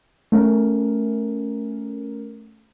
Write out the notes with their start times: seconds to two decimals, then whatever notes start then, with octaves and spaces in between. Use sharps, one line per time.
0.32 A3 C#4 A#4